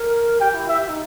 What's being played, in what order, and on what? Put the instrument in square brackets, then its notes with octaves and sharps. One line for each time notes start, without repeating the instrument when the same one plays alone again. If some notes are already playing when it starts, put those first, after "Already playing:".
Already playing: [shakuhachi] A#4
[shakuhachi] G4 [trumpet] G5
[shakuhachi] E4
[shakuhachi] G4 [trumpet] E5
[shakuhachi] D#4